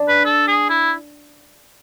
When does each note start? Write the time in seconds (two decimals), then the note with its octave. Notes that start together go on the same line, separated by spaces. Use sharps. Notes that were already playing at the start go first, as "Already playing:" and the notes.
Already playing: D4
0.08 B4
0.25 A4
0.47 G#4
0.69 E4